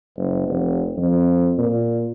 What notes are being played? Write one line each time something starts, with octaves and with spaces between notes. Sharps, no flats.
F#1
F1
F2
A#2